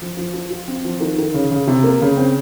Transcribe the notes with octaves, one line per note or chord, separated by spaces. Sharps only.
F3
F3
F3
F4
C4
F3
D#3
D#3
C#3
C#3
C3
A#3
C#3
C4